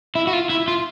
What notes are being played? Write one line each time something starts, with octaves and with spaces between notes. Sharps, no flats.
E4
F#4
F4
E4
F4